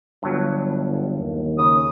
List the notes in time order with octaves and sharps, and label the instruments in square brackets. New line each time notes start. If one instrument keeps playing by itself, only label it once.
[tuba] G1 [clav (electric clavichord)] G2 F#3
[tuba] D#2
[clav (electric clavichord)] C#3 [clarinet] D#6